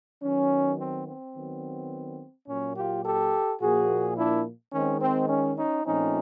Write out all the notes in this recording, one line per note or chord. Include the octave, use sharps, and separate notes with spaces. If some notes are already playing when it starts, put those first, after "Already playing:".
D#3 F#3 B3 C#4
C4
C4
D#3 F#3 B3
A#2 F#3 A#3 C#4
F4 G4
G4 A4
A#2 F3 A#3 F#4 G#4
D4 E4
D#3 G#3 C4 C#4
C4
C#4
C#4 D#4
A#2 F3 A3 C4 C#4 D#4